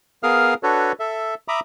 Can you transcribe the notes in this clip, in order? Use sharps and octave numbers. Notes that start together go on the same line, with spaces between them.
B3 G#4 A#4 F5 D#6 F6
D4 F#4 A4 B4 C#5
A4 E5
E5 A#5 B5 D6 D#6